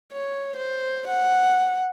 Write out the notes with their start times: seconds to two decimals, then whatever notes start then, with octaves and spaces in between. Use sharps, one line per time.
0.12 C#5
0.57 C5
1.08 F#5